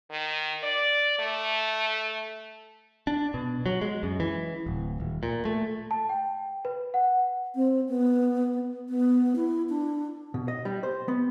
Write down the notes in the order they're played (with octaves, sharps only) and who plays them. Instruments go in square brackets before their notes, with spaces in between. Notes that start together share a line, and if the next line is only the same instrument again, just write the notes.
[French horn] D#3
D5
A3
[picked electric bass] D4
B2
F#3
G#3
F#2
E3
D1
D#1
A#2
A3
[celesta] A5
G5
B4
F#5
[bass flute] C4
B3
B3
E4
D4
[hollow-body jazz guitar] B2
D#5
G3
C5
B3